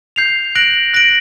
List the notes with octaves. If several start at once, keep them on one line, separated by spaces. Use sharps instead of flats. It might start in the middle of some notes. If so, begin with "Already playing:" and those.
G6 C7 F7
F#6 A#6 D7 F#7
F#6 A#6 D7 F#7